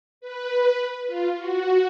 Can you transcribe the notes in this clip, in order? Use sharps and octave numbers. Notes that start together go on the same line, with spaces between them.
B4
F4
F#4